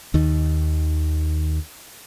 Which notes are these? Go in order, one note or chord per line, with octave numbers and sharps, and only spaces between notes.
D#2 D#3